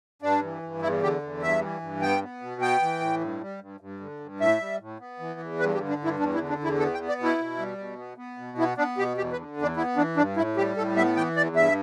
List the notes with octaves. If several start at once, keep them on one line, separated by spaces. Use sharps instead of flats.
G2 D4
E3
G2
E2 E4
D3 G4
E2
G2 E5
E3
G2
B3 G5
B3
B2
B3 G5
E3
A2
G2
G3
G2
G2
D3
G2
A2 E5
G3
A2
B3
E3
E2
G2 B4
G4
D3
D4
G2
E4
E2 D4
E4
D3
D4
E2 E4
B3 A4
G5
B3
D5
B2 E4
B2
G3
B2
B3
B3
B2
B3 E4
B3 D4
B2 G4
E2 G4
B4
D3
E2
D4
B3 E4
E3 D4
G2 D4
A2 E4
G3 G4
A2 A4
B3 E5
E3 G5
E2 D5
G2 E5